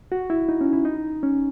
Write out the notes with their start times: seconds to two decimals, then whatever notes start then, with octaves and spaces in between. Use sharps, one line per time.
0.12 F#4
0.30 E4
0.49 D#4
0.61 C#4
0.73 E4
0.85 D#4
1.23 C#4